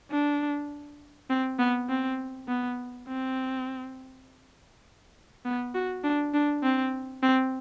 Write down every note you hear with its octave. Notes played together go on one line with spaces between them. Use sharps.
D4
C4
B3
C4
B3
C4
B3
F#4
D4
D4
C4
C4